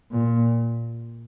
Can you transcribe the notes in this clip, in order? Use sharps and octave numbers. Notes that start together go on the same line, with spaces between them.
A#2